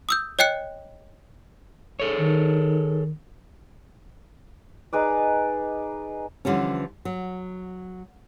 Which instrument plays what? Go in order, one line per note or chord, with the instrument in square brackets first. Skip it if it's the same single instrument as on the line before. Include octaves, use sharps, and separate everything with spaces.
[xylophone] D#6 E6 G6
C#5 D#5 G5 F#6 C#7
[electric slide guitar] G#4 A4 C#5
[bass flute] D#3
[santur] D#4 G#4 B4 D5
[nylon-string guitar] D3 E3 F3 G3 C#4
F#3